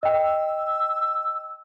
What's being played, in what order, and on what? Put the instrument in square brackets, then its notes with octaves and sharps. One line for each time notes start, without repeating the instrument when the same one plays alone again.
[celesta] D#5 G5 [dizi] E6